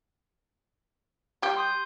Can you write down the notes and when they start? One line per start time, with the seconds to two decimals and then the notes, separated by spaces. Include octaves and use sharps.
1.42 G3 G4
1.57 C6 D#6 G6